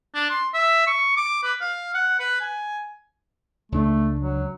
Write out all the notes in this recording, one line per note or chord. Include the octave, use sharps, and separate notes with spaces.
D4
C6
E5
C#6
D6
B4
F5
F#5
B4
G#5
C#2 A3 D4
F#3